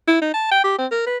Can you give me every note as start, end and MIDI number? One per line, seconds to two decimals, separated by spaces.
0.08 0.20 64
0.21 0.33 63
0.34 0.47 81
0.51 0.60 79
0.64 0.75 67
0.79 0.86 60
0.91 1.03 70
1.06 1.17 71